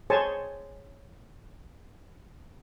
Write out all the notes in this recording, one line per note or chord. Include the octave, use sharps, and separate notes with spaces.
G#4 C5 C#5 G#5 A5 C#6